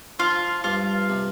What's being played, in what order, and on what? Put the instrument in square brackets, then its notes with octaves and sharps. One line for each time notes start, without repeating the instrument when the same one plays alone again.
[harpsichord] F3 [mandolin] F4
[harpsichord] G2 [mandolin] F4
[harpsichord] C3